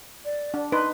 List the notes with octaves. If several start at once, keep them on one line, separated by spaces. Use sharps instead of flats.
D5
D4
D#4 B4 C6